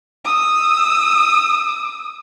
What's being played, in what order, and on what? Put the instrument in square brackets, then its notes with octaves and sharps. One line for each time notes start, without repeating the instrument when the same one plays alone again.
[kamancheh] D#6 E6